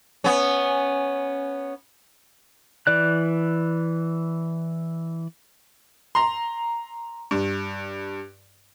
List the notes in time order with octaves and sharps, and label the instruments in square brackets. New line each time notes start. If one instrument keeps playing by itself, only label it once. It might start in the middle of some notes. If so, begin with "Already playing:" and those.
[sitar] B3 C#4
[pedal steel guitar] E3 D5 F#6
[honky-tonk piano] A#5 C6
G2